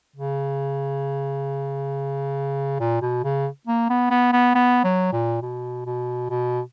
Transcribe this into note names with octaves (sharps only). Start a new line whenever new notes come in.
C#3
A#2
B2
C#3
A#3
B3
B3
B3
B3
F#3
A#2
B2
B2
B2